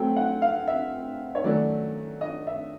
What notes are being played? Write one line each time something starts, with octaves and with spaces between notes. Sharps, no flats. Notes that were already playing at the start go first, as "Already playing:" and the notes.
Already playing: F#3 A3 C4 G5
F#5
F5
E5
C#5
D#3 F#3 A3 C#4 D5
D#5
E5